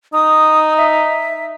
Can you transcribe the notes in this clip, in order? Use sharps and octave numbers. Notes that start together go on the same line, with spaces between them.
D#4 D#6
E5